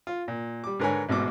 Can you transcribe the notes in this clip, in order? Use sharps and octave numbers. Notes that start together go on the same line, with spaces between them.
F4
A#2
G3 D6
G#2 D3 A#4 B4 C#5 G#5
A1 G#2 B2 D6